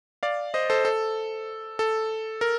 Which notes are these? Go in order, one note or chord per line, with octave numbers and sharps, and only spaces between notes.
D5 F5
C5 D#5
A4 C5
A4
A4
A#4